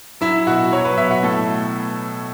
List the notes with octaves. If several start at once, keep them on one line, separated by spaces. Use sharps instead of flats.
F#3 E4
B2 F#4
F#3 C#5
B4
B2 E5
F#4
A2 A4